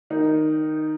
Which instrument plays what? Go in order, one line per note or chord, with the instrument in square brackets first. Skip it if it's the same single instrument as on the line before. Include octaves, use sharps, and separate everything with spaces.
[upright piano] D#3 D#4